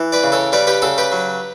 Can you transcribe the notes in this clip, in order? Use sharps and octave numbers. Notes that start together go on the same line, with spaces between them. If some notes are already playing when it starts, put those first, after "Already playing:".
Already playing: E3
B4 D5
C#3
A4 C#5
G3 B4 D5
G4 B4
C#3 F#4 A4
G4 B4
F#3